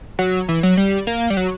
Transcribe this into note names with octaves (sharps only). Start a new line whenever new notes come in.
F#3
E3
F#3
G3
A#3
G3
F#3